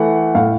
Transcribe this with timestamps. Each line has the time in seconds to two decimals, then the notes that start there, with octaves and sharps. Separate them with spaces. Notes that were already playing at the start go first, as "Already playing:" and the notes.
Already playing: E3 A3 F#5
0.35 A2 F5